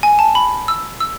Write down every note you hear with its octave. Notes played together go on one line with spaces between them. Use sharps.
G#5
A5
B5
E6
E6